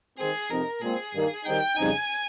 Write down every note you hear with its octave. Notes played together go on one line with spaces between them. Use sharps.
D#3 G#3 C4 G#4
F2 C3 F3 C4 D#4 A#4
A#2 G#3 C4 G#4
G2 D#3 A#3
D#3 G3 C4 D#4 G5
F2 C#3 G3 C4 D#4 G#5